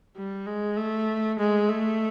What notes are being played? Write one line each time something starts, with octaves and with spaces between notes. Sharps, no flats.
G3
G#3
A3
G#3
A3